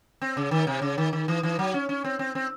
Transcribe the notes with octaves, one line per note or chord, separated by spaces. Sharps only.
C4
C#3
D#3
C3
C#3
D#3
D#3
E3
E3
F#3
C#4
C#4
C4
C4
C4